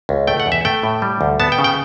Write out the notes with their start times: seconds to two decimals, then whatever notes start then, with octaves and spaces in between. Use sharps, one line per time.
0.09 C#2
0.27 A3 G5
0.40 F#5
0.46 E2
0.52 E5
0.65 A3 G5
0.83 A2
1.02 G3
1.21 D2
1.40 B3 A5
1.52 G5
1.58 C#3
1.64 G5